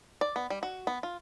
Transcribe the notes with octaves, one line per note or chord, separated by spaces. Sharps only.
D5
B3
G3
F#4
B3
F4